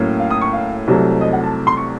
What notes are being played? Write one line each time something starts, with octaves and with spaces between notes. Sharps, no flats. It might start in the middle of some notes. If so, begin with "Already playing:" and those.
Already playing: A2 F#3 A#3 C#4
F5
D#6
C#6
F5
C2 C3 F#3 A3
D#5
F#5
A5
C6
C#6